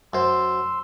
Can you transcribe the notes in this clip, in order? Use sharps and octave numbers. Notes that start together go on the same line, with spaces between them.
F#2 C5 C6 E6